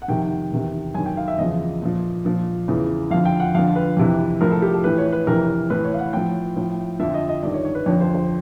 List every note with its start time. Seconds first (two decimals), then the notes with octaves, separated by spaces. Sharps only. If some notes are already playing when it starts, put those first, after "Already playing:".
0.02 F#5
0.08 F2 C3 D#3 G5
0.52 E2 C3 D#3
0.94 F#2 D#3 G#5
1.06 G5
1.17 F5
1.28 E5
1.38 E2 C#3 F3 D#5
1.82 A#2 F3
2.25 A#2 F3
2.68 E2 C#3 E3
3.11 F2 D3 F3 F5
3.25 G5
3.40 F#5
3.55 F2 D3 F3 F5
3.76 B4
3.97 F2 C3 E3
4.41 A2 F3 A#4
4.51 A4
4.62 G4
4.73 A4
4.84 A2 E3 B4
4.98 C#5
5.12 B4
5.27 F2 C3 E3 A#4
5.70 A2 E3 B4
5.84 C#5
5.94 F5
5.99 F#5
6.13 A2 F3 G5
6.56 A2 F3
7.00 F2 D3 F3 E5
7.14 D#5
7.29 D#5
7.43 G2 D#3 D5
7.54 C#5
7.65 C#5
7.75 B4
7.86 F2 D3 F3 C#5
8.01 C5
8.14 C5